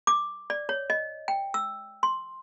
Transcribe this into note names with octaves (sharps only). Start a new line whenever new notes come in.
D6
D5
C#5
D#5
G5
E6
C6